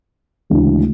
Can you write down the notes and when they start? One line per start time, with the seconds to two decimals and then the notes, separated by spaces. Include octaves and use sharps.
0.50 D2 C#3 E3 G#3 D4